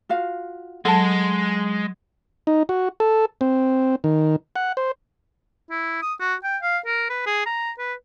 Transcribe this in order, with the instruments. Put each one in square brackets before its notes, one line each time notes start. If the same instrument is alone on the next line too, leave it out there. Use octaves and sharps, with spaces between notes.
[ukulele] F4 F#4 F5
[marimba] F#3 [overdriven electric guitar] G#3 [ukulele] A4 D#5 A5
[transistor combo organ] D#4
F#4
A4
C4
D#3
F#5
C5
[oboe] E4
D#6
F#4
G5
F5
A#4
B4
G#4
A#5
B4